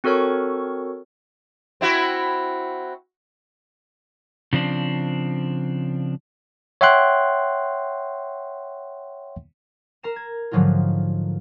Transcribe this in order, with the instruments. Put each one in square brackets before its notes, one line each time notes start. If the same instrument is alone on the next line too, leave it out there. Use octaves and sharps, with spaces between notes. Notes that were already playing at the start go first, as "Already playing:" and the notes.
[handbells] C4 F#4 A4 A#4 C#5 C#6
[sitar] C4 E4 F#4
[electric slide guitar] C#3 F3 C4 D4
[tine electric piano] C#5 E5 F#5 G5 C6 F#6
[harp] A#4 A#5 C7 E7
G#6
G#2 D3 F3 F#3 D#4 F4